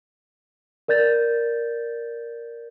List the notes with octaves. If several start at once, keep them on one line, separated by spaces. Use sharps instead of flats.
A#4 D5 G6 A6